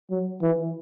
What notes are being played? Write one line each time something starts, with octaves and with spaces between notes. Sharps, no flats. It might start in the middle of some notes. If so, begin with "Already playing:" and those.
F#3
E3